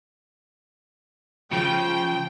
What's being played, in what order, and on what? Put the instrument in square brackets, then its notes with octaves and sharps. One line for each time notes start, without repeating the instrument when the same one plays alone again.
[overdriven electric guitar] C#3 [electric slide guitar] F3 [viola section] G5